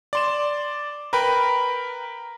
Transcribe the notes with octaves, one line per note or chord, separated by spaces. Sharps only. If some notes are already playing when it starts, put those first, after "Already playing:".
D5 C6 E7
A#4 B4 G5 B5